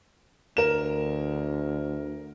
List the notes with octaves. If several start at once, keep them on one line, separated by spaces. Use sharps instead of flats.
D2 A#4 E7